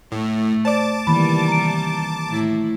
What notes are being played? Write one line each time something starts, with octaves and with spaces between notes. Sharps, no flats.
A2 A3
C5 D5 A5 D6
C3 D#3 E3 G3 A#3 B5
A#5 D7
A2 E4